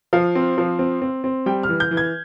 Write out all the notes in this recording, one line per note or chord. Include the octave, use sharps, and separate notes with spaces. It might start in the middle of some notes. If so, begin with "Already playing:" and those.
F3 F5
C4
F3
C4
C4
C4
G3 G5
F6
E3
G6
E3
G#6